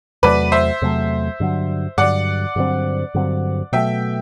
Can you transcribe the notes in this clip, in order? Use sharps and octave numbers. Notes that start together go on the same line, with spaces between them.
E2 C3 F#3 A3 B4 D5
C5 E5
E2 C3 F#3 A3
G2 D3 F#3
G2 D3 F#3 D5 F#5
G2 D3 F#3 C4
G2 D3 F#3 C4
B2 F#3 A3 E5 G5